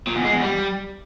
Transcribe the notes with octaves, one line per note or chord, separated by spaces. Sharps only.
A#2
E2
G#3
E2
G3